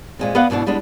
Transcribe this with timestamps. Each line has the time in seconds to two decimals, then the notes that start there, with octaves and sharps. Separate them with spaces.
0.19 A#2 G#3 C4
0.35 B3 B4 D5 D#5 F5 F#5
0.50 G#2 B2 E3 D4
0.66 G3 G#3 B3 D4